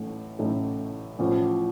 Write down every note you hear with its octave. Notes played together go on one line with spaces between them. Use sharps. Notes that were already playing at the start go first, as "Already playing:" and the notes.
Already playing: A1 A2 A3 D#4
A1 A2 A3 D#4
A1 A2 F3